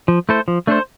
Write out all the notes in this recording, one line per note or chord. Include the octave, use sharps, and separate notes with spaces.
F3
A3 E4 A4 C5
F3
A3 D4 A4 C5